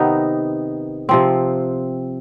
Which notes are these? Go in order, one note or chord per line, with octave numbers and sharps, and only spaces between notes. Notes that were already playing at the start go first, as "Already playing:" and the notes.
Already playing: C3 D#3 B3 D#4
C3 F3 C4